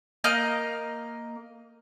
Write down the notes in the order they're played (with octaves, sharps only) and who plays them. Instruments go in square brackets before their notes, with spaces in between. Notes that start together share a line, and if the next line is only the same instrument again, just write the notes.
[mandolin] A#3 D#5 F6 G6